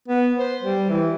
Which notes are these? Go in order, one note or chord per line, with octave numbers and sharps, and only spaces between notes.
B3
C5
G3
E3